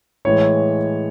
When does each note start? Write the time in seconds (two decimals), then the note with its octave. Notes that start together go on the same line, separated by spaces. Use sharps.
0.25 A2 E3 G#3 C#5